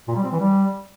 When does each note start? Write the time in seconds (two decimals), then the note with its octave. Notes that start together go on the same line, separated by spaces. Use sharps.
0.08 A#2
0.16 G3
0.24 C4
0.32 E3
0.40 G3